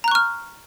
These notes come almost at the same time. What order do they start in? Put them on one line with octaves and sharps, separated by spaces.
A#5 F#6 C#6 F6